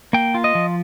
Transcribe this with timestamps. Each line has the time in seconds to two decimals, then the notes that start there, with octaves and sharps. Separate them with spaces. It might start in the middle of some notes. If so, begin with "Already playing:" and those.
0.13 A#3 G5
0.34 F4
0.44 D#5
0.55 F3